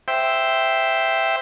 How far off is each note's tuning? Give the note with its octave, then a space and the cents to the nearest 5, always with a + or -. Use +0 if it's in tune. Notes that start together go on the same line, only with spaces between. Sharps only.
C5 -5 E5 +0 G5 +0